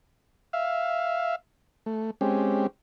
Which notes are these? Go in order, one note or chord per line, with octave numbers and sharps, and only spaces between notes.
E5 F5
A3
G#3 C4 C#4 G4